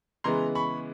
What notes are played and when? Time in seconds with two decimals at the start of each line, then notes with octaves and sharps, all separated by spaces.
0.24 C#3 E3 G#3 B3 A#5 C6
0.55 B5 C#6